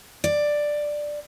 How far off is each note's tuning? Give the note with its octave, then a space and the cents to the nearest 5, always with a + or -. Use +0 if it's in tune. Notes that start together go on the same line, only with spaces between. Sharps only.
D5 +5